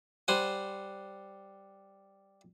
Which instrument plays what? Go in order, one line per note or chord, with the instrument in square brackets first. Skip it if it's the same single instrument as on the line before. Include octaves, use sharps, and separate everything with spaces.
[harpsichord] G3 C5 F#5 G#5